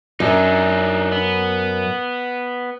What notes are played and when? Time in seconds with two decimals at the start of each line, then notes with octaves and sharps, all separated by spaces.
0.20 F#2 D4 D#4
1.12 B3